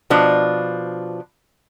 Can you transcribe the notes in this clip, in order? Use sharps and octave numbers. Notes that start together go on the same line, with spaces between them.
B2 F3 D4